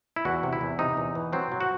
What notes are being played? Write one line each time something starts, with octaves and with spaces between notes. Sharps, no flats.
E4
E2 F#4
C3
E4
E2
C3 D#4
E2
E3
F#3 C4
F#3
F#4